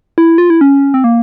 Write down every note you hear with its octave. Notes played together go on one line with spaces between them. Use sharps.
E4
F4
E4
C#4
C4
A#3